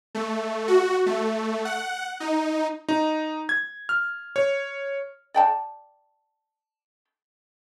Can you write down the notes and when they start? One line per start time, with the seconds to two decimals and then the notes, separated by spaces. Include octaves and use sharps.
0.15 A3
0.68 F#4
1.06 A3
1.65 F#5
2.20 D#4
2.89 D#4
3.49 G#6
3.89 F6
4.36 C#5
5.34 D5 G5 A5